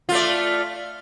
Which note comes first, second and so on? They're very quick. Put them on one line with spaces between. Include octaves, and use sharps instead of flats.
F4 A3 D5